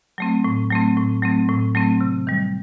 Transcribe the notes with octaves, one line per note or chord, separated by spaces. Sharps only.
F#3 A3 C4
A2
F#3 A3 C4
A2
F#3 A3 C4
A2
F#3 A3 C4
C3
D#3 G3